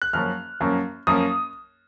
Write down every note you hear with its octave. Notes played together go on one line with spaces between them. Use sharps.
F#6
F#2 F3 A#3 C#4 F6
F#2 F3 A#3 C#4
F#2 F3 A#3 C#4 D#6